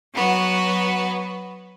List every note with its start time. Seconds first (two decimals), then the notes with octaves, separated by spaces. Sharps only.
0.14 F#3 B3 F#4